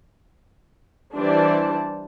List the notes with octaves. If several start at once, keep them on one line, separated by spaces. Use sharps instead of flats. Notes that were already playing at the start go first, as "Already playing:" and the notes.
E3 G3 D4 C5 D5 A5